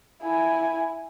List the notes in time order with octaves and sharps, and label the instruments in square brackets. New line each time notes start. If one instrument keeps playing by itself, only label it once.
[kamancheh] E4 G#5